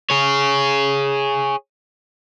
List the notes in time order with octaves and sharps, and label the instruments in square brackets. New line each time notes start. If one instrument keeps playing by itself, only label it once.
[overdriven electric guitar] G#4 C#5